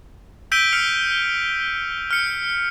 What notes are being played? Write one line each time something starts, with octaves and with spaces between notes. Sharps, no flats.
E6 G6 B6 D7 D#7 G7
F6 C#7 F7
F6 C#7